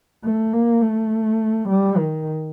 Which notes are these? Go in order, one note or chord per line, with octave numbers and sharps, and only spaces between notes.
A3
A#3
A3
G3
D#3